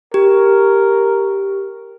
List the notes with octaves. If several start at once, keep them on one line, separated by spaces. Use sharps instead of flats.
G4 A#4